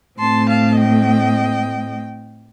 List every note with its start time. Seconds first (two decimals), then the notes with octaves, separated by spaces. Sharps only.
0.18 A2 A3 C4 A5 C6
0.48 F5 A5
0.77 D#5 G5